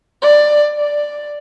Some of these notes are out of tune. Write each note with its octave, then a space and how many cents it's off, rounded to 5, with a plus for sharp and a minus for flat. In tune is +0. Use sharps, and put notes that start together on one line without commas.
D5 +15
D5 +5